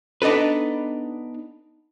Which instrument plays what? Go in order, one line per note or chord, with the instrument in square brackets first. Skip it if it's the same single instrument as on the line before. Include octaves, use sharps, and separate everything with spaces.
[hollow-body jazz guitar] B3 D4 D#4 A4 B4